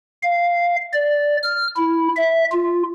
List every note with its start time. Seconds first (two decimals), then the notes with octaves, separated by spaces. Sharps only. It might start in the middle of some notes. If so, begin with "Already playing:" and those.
0.23 F5
0.94 D5
1.43 F6
1.77 E4
2.16 E5
2.51 F4